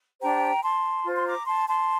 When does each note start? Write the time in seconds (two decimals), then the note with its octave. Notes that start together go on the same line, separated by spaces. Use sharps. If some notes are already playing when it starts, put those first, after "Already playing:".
0.21 D4 G4 C5 G5 A#5
0.63 A5 C6
1.04 F4 C5
1.17 C6
1.25 A#5 D6
1.46 A5 C6
1.68 A5 C6